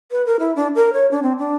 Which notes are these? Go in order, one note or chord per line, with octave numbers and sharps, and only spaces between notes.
B4
A#4
E4
D4
A#4
C#5
D4
C4
D4